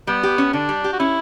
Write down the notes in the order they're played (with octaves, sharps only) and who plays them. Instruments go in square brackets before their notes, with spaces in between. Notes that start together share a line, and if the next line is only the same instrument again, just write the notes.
[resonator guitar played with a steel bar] G3 [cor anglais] B3
[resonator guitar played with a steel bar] G4
C#4
[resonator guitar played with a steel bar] D3 [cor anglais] D4
[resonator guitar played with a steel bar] G3
G4
[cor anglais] F#4
[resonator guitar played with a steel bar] C#4 [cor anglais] E4